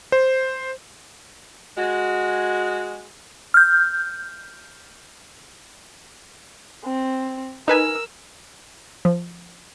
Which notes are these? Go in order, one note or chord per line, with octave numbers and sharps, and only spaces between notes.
C5
G#3 F#4
F6 G6
C4
D#4 A#4 B4 G#5 E6
F3